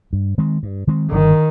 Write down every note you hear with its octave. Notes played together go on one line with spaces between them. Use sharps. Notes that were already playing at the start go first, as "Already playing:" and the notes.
G2
D#3 G#3 C4
G2
D#3 G#3 C4
G1 D#3